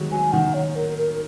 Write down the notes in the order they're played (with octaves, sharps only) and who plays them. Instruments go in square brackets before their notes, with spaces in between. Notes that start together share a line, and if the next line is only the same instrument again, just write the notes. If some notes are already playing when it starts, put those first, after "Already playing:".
Already playing: [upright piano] D#3 F#3 G#3
[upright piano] F#3 [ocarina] G#5
[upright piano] D#3 [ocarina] F#5
[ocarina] C#5
A#4
A#4